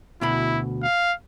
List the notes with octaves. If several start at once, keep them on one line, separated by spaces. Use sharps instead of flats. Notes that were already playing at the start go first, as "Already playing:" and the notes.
D2 B2 E4 B5
F5